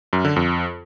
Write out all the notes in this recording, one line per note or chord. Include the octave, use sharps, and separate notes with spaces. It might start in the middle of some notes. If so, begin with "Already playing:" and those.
F#2
D3
F2